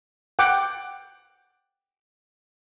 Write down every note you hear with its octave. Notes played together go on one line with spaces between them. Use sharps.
F#5 G5 D6